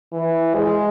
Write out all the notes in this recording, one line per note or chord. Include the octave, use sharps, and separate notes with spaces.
E3
G#3